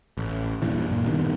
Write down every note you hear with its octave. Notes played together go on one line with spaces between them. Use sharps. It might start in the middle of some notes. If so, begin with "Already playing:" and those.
A1
E1 G2 A#2 E3
F#2 A#2
G2 B2 D3 D#3